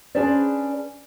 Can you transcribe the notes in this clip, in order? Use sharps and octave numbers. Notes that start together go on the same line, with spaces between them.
C#4 D4 G#4 B4 C5 D5